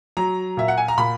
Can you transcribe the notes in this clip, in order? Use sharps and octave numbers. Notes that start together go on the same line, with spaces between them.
F#3 A#5
A#2 E5
F#5
G#5
A#5
A#2 B5